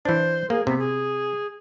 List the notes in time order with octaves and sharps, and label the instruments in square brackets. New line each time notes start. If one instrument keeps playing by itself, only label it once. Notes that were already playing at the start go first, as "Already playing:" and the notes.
[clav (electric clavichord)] E3 D4 [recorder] C5
[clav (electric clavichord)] A#3 [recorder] G#4
[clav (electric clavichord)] C3 [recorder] B3
[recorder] G#4